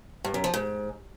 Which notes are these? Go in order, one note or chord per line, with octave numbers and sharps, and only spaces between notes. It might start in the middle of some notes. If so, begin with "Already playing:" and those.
G2
F#2
F3
G#2